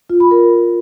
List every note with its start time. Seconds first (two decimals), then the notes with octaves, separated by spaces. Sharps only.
0.10 F4
0.20 B5
0.31 A#4